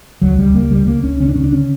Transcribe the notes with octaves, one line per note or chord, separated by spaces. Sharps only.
C#2 F#3
C#2 G3
C#2 A#3
C#3 G3
C#3 A#3
C#2 C#4
C#3 C#4
D4
C#3 C#4
D4
D3 C#4